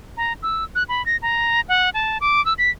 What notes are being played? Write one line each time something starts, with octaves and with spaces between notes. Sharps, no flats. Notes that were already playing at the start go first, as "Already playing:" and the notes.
A#5
E6
F#6
B5
A#6
A#5
F#5
A5
D6
E6
B6